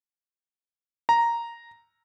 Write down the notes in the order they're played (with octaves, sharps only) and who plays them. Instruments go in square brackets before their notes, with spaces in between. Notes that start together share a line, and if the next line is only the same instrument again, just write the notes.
[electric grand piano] A#5